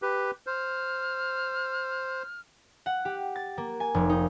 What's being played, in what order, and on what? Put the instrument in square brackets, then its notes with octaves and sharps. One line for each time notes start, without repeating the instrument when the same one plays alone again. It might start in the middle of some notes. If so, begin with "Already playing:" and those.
[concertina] G4 B4
[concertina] C5 [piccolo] F6
[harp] F#5
G4
A6
A#3
G#5
F1
D#4